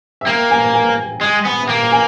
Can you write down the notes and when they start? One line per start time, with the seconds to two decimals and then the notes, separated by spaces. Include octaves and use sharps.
0.21 E5
0.26 A#3 G5
0.50 G#5
0.74 G#5
1.21 G#3 G5
1.44 B3 G#5
1.62 E5
1.68 A#3 G5
1.92 G#5